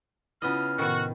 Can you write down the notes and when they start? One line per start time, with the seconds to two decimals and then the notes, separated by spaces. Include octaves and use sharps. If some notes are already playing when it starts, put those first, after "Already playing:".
0.42 C#3 B3 E4 F4 D#5 F6
0.78 A2 C3 D#3 B3 F#4